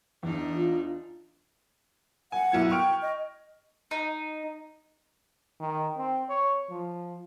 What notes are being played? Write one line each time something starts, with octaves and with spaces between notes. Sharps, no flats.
E2 D4 D#4
F4
F#5 G#5
B1 E4 G#6
G5 C#6 F6 D7
D#5
D#4
D#3
C4
C#5
F3